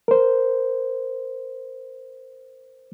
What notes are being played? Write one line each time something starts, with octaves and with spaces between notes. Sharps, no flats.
A#4 C5